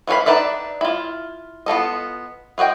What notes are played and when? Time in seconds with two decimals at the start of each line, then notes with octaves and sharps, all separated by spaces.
0.07 E3 C#4 F#4 F5 B5
0.26 D4 D#4 B4 D5 E5
0.81 E4 F4
1.66 B3 F4 A4 D#5
2.58 F4 F#4 D#5 G5